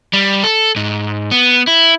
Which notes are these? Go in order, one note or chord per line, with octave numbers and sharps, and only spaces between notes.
G3
A4
G#2
B3
E4